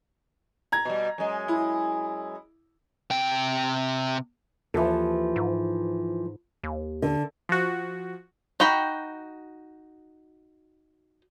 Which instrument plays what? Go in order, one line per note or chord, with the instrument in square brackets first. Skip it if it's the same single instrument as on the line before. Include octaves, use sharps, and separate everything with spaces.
[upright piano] A#5 G#6
[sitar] B2 G3
F#2 G#3
[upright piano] E4
[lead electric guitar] C3 G5
[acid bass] D#2 [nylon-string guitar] E3 F3 A4
[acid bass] G#2
D#2
[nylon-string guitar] D3
[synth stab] F3 F#4
[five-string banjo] D#4 F#4 G5 B5